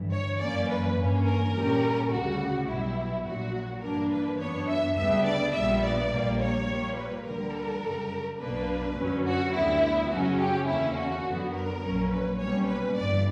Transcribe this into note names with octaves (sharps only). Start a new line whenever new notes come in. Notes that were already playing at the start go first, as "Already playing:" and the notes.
Already playing: G1 G2 E3
C#5
F#2 E3 A#3 C#4 D5
B4
G2 E3 A#3 C#4
A#4
A#2 G3 C#4
D2 C#3 G3 F#4
B1 B2 G3 E4
A#1 A#2 F#3 F#4
G2 E3 A#3 D4 A#4
B4
F#2 E3 B3 D4 C#5
E5
D2 C#3 G3 B3 D4 E5
D5
A#1 A#2 G3 B3 E5
D5
A#1 A#2 G3 A#3
C#5
A#2 G3 A#3
B4
D2 D3 G3 A#4
F#2 C#3 G3
B1 B2 A#3 D4 B4
F#2 D3 F#3 C#4
F#4
D2 D3 G3 B3 E4
F#2 C#3 F#3 C#4 F#4
G4
E2 D3 A#3 C#4 E4
F#4
F#2 D3 F#3 B3
A#4
A#1 A#2 F#3 C#4
B4
B1 B2 G3 A#3 C#4 C#5
B4
G1 G2 E3 D5